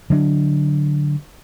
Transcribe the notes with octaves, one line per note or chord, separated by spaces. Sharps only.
D3 F#3 D4